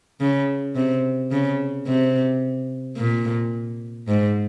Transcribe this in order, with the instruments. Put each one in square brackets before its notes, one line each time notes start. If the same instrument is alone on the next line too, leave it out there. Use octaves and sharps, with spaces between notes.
[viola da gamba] C#3
C3
C#3
C3
A#2
G#2